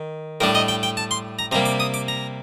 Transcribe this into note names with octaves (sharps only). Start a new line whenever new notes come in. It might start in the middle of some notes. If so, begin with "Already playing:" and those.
Already playing: D#3
A2 G3 D4 A#4
D#5
G5
G5
A5
C6
A#5
C3 G3 A#3 A#5
D6
D#6
D6
A#5